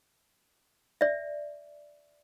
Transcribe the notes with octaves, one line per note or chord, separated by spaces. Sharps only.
D5 E5